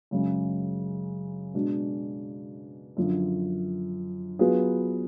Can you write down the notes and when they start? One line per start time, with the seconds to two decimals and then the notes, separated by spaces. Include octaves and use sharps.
0.11 F#2 C#3 G#3
1.54 B2 G#3 D4
2.97 F#2 D3 F3
4.39 F#3 B3 F4 G#4 B4